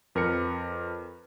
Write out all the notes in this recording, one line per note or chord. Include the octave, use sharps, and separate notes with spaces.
F2 A#4 B4 C#7